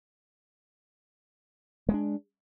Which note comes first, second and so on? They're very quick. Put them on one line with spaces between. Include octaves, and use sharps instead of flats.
G#3 A#3 D4